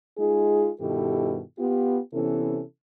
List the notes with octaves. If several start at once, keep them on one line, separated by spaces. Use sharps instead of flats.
G#3 D#4 F4 G#4
G2 B2 D#3 E4 G4 A4
B3 F4 G4
C3 E3 B3 C#4 E4 A4